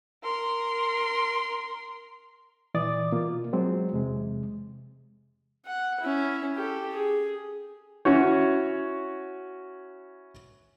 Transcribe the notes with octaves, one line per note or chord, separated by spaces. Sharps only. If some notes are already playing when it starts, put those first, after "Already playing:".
A#4 C6
A#2 E3 D5 D6 D#6 A6
B2 A#3 F4
F#3 G#3 C4
E2 C3 G#3
F#5
C#4 E4
G4 A4
G#4
C#4 E4 F#4 C#5